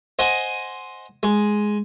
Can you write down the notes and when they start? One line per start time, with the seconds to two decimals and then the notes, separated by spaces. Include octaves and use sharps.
0.19 C5 D#5 F#5 G#5
1.23 G#3